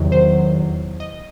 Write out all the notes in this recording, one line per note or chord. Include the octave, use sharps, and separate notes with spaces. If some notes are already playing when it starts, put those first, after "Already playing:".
Already playing: E2 C3 D#3 F#3
C5
D#5